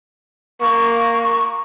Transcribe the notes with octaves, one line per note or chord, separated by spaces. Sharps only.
A#3 C#6